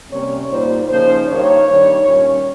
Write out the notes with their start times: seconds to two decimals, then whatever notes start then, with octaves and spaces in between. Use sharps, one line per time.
0.10 C3 G3 A#3 C#4 C#5
0.50 A#2 G3 A#3 D#4 C5
0.89 C#3 F3 A#3 D#4 C5
1.27 G2 D#3 A#3 C#5
1.67 G2 D#3 G3
2.06 A#2 G3 C#4